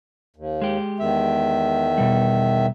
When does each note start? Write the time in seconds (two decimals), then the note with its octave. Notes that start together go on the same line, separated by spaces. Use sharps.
0.36 D#2
0.62 G#3 G4
1.00 E2 D#3 E5
1.98 B2 G3